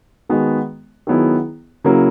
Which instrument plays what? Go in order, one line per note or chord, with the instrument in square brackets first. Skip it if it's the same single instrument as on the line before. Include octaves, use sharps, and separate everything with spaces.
[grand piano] D#3 G#3 B3 F#4
D#3 F#3 B3 E4 G#4
C#3 F#3 A#3 E4